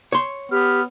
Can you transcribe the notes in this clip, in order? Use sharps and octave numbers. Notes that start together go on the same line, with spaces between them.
C#5 C6
B3 G4 F6